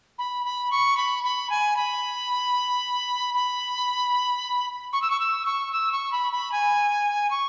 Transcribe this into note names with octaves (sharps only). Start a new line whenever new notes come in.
B5
B5
C#6
B5
B5
G#5
B5
B5
C#6
E6
C#6
E6
C#6
E6
C#6
B5
B5
G#5
C#6